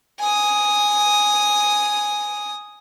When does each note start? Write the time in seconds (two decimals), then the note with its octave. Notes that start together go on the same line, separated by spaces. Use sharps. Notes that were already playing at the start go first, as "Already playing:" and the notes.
0.20 G#5 D#6